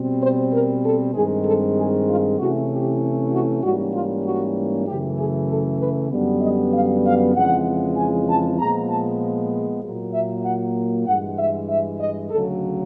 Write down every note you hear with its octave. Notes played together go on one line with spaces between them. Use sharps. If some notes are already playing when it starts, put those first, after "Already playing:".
Already playing: B2 G3 C4
C5
A#4
A4
G2 D#3 G#3 C4 G#4
A4
G#4
F4
C3 E3 A3 C#4 E4 F#4
G4
F#4
G#2 E3 G3 A#3 C#4 F#4
F4
F#4
F#2 C#3 E3 A3 G4
G#4
A4
B4
F#2 D3 G3 B3
D#5
F5
F5
F2 C#3 E3 G#3 F#5
G#5
A5
A#2 F3 G#3 B3 A#5
A5
A#2 F#3 A#3
E5
F#5
G2 E3 G#3 F#5
E5
E5
D#5
D2 C#3 F#3 A4